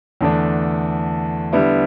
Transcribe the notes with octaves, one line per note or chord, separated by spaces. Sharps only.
E2 D3 A3 D4
D3 G3 B3 E4